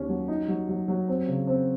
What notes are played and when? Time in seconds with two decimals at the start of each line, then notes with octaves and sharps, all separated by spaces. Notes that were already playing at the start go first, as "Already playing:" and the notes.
Already playing: D#2 C#4
0.09 F#3
0.28 D#4
0.48 F#3
0.69 F#3
0.88 F#3
1.08 C4
1.28 C#3
1.47 C4